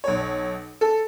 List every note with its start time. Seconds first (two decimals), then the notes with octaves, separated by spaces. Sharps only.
0.04 B1 C#5
0.81 A4